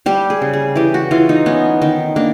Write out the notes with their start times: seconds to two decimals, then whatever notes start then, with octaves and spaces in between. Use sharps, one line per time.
0.06 G3 G4
0.30 G#4
0.42 C#3
0.53 G#4
0.76 E3 G4
0.94 F#4
1.11 E3 F4
1.29 D#4
1.46 B3 C#4
1.82 D#3
2.16 A#3 D4